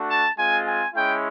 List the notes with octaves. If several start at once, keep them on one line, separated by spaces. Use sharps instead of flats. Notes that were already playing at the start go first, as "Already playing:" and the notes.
Already playing: A3 D4 F#4
A5
G#3 C4 F4 G#5
G#5
G#3 C#4 E4 G5